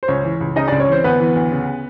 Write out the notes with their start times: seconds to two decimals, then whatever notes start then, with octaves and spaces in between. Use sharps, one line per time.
0.03 C5
0.08 C#2 C#4 C#5
0.24 E3
0.41 C#2
0.56 C#3 D#4 D#5
0.68 C#2 D4 D5
0.80 C#4 C#5
0.89 E3 C4 C5
1.04 D2 B3 B4
1.20 E3
1.36 D2
1.52 C#3